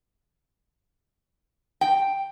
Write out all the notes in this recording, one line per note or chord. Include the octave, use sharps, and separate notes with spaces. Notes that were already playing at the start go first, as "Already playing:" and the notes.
G5